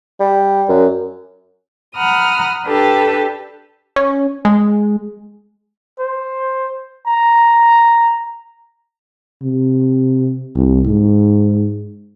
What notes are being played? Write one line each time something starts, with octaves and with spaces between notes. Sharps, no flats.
G3
F#2
F#5 A#5 B5 D#6 F6
D4 G4 A4 B4 A5
C#4
G#3
C5
A#5
C3
C2
G#2